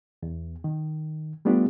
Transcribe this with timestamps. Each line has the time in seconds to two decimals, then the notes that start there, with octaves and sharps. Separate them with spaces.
0.23 E2
0.64 D#3
1.45 G3 A3 B3 D4 F4 G4